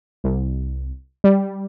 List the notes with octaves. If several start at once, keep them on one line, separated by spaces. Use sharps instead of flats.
C2
G3